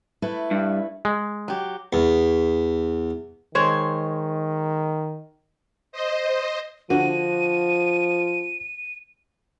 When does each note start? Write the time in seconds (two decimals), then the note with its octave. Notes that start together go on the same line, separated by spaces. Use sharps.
0.22 A3 E4 B4
0.51 G2
1.05 G#3
1.48 F#3 G4
1.93 E2
3.55 D#3 G#3 C5 C#5
5.92 C5 D#5
6.90 D3 F3 F#4 D#7